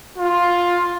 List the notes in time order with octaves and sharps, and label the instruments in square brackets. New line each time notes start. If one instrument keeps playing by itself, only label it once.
[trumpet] F4